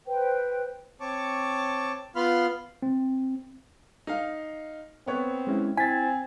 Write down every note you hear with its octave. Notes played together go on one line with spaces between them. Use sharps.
B4 C5 G5
C4 C#5 A5 C#6 D6
B3 F4 F5 B5 C6 F6
C4
D#4 F5
B3 C4 B4 C#5
G#3 C#4 E4
C4 E4 G#5 A6 B6